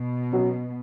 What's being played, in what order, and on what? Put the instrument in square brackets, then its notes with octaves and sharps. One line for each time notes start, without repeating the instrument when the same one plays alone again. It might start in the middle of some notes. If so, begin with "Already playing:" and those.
Already playing: [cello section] B2
[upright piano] F#3 C#4 F#4